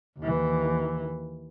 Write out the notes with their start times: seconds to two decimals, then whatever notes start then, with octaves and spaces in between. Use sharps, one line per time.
0.19 D#2 E3